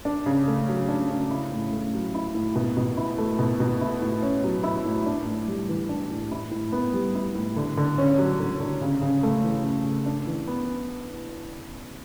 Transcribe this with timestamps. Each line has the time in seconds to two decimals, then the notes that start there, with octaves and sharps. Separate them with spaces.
0.05 D4
0.26 C#3
0.47 A3
0.68 F#3
0.89 D4
1.10 C#3
1.30 E4
1.52 A2
1.72 A3
1.94 F#3
2.14 E4
2.35 A2
2.55 B2
2.77 B2
2.97 E4
3.18 A3
3.39 B2
3.60 B2
3.81 E4
4.02 A2
4.22 C#4
4.44 F#3
4.63 E4
4.85 A2
5.06 D4
5.26 A2
5.47 G3
5.69 E3
5.89 D4
6.10 A2
6.31 E4
6.51 A2
6.72 B3
6.93 G3
7.15 E4
7.35 A2
7.56 D3
7.77 D3
7.98 C#4
8.18 F#3
8.40 D3
8.60 D3
8.82 C#3
9.02 C#3
9.23 A3
9.44 E3
9.64 C#3
9.85 C#3
10.06 D4
10.27 E3
10.47 B3